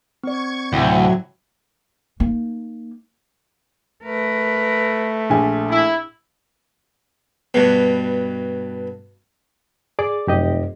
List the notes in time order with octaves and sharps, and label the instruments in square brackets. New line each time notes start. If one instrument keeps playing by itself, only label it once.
[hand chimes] C4 D5 [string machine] C#6 G#6
[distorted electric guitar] D2 [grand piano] A2 C3 [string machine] F#3
[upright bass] A#3 D#4
[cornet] A3 [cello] A#4 B4
[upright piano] A#1 G#5
[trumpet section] E4
[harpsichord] G2 B2
[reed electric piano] G#4 D5 D6
[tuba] F1 [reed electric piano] F#2 G4 D#5